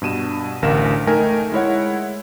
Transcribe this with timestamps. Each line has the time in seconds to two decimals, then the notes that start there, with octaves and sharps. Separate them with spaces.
0.02 G2 B2 D#7 E7
0.62 A1 D2 A#4 F5 E7
1.07 A3 D#4 A#4 G5 G#5
1.52 G#3 E4 C#5 F#5